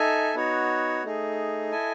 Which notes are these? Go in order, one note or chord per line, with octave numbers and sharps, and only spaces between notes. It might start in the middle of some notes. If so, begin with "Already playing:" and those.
Already playing: D#4 A4 E5 G#5
B3 D#4 F#4 C#5
A3 D#4 G#4
E4 A4 D#5 G#5